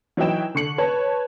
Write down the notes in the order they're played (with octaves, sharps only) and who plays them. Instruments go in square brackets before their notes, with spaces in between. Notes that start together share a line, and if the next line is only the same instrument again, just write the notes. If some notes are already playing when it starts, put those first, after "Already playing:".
[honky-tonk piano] E3 F#3 D#4 E4 G5 E7
D3 C#6 C#7 F#7
B4 C#5 A5